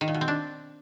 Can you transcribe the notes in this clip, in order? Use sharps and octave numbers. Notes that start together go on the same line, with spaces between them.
D#3
A#2
B2
C4
D4